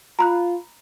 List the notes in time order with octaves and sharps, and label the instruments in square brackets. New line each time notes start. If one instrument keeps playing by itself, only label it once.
[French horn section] F4 [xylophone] A#5 B5 F#6